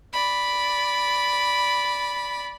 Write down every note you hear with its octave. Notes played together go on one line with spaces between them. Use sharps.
D5 B5